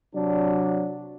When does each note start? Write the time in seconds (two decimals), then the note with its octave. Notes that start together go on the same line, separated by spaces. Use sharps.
0.15 C3 F#3 D4